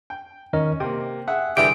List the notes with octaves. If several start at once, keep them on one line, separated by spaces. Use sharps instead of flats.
G5
D#3 C#4 A#4 D#5
C3 A#3 G5
G#4 E5 F#5
C2 D3 E3 G4 G#4 D7